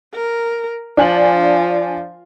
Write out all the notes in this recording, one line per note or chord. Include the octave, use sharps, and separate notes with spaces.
A#4
F3 D4 G#5 F#7